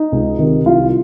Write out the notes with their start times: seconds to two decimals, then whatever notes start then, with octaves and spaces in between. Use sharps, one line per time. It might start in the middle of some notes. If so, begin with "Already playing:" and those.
Already playing: D#4
0.12 C#2
0.39 C3 D#3
0.66 C2 F4